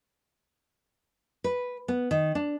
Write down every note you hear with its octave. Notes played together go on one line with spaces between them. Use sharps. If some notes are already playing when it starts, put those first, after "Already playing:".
B4
B3
D#3
D4